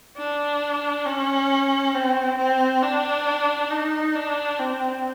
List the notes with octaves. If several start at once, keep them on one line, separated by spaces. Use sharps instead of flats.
D4
C#4
C4
C4
D4
D#4
D4
C4